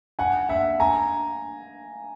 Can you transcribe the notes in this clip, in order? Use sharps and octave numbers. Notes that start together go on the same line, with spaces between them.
F#5 G#5
E5 F#5
G#5 A#5